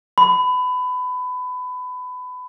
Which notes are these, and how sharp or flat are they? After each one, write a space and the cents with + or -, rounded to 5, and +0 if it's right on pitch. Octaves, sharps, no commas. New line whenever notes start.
B5 +25